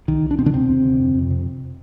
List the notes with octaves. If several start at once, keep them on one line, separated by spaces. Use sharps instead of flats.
C2 D#3
C2
D4
B2 C4
D3 D4
D#2 C3 C4
D#2
D3
F2
F2
C3